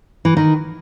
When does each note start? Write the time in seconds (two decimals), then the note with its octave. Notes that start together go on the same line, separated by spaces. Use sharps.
0.25 E3
0.37 D#3